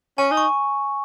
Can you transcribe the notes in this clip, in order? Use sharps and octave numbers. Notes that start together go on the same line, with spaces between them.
C#4 G#5
D#4
C#6